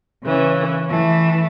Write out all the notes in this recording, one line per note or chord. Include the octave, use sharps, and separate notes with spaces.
C#3 E3 C#4
E3 A3